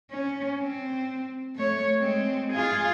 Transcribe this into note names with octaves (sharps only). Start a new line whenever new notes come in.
C#4
C4
A3 C#5
G#3 C4
F4 G#4